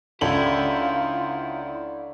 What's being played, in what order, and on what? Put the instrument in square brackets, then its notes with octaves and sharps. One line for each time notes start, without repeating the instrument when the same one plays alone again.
[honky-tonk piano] C#2 A4 F#7 [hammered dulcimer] D3 C#5 [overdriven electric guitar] E4 [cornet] F4